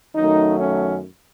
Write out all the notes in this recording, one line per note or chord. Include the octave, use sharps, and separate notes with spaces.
F#2 D#3 F#3 A3 D#4
C#4